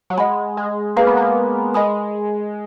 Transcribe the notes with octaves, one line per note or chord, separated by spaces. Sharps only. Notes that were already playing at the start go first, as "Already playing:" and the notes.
F#3
G#3 D#5 F#5 B5
G#3
A#3 G#4 B4 F5
B3
A#3
G#3 A#4 D#5 G#5 B5 D#6